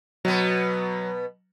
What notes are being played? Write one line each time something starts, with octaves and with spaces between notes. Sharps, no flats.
B2 F#3 B3